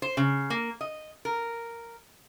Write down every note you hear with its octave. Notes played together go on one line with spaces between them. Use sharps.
C5
C#3
A#3
D#5
A#4